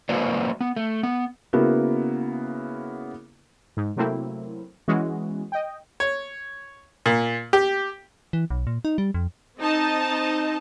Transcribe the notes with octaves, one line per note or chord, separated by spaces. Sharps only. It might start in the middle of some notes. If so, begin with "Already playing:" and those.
F#3 A#3 F#4 B4 C5 D5
B3
A3
B3
C#3 A#3 B3 E4 F#4
G#2
C3 F#3 A3 A#3 C4 E4
E3 G#3 B3 C#4 F#4
D#5 G5
C#5
A#2
G4
E3
B1
A#2
D#4
G3
F2
C4 D#4 D#5 A5